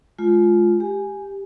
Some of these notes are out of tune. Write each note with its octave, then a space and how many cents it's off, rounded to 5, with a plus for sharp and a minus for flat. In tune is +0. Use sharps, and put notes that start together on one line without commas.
G#3 +35 F4 +0
G4 +0 G#5 +0